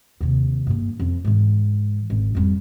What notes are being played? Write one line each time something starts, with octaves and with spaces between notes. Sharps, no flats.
D#2 C3
G2 A#3
F2
G#2 E3
G#1
F2 G3